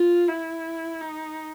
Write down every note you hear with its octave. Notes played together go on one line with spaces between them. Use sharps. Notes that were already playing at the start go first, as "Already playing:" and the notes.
Already playing: F4
E4
D#4